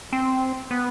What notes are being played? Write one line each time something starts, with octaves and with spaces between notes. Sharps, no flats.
C4
B3